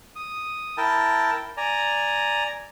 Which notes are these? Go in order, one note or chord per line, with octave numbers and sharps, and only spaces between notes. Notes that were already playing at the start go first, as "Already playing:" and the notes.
D#6
E4 A#4 G5 A5
D5 G#5 A#5